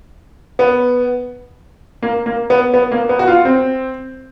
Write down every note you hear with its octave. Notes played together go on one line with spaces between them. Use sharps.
B3
A#3
A#3
B3
B3
A#3
B3
F#4
F4
C4